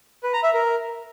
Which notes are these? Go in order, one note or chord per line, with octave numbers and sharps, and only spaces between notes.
B4
A#5
E5
A#4